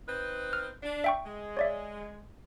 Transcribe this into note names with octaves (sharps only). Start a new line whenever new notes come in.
C4 D#4 B4
F6
D4
E5 G5 C#6
G#3
C#5 D5 E5